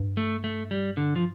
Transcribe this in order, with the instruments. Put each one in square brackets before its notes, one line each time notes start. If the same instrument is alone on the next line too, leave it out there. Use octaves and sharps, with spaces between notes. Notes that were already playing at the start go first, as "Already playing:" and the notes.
Already playing: [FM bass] G2
[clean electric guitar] A3
A3
G3
D3
F3